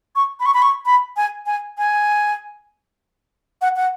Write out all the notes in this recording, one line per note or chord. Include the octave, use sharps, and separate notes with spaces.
C#6
B5
C#6
B5
C#6
B5
G#5
G#5
G#5
F#5
F#5